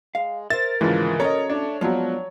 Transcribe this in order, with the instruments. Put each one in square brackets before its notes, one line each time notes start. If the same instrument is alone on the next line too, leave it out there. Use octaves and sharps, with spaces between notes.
[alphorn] G#3 [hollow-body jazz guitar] F5
[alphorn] A#4 [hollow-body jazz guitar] C5 E5 [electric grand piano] A6
[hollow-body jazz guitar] D2 [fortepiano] G#2 C#3 F3 [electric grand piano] E3
[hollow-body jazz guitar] C#4 F#4 A4 [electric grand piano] C#5 [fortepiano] D#5 A#5
[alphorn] A3 [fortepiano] D4
[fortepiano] F3 F#3 [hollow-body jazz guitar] G#3 B3 [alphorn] D4